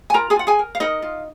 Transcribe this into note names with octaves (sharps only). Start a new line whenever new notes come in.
G#5
F4 A#4 A#5
G#4 G#5
F4 F#5
G#4 G#5
A#4
F5
D#4 A#4 D#5
F4